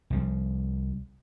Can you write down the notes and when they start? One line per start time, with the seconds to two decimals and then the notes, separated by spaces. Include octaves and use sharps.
0.10 C2 F3 G3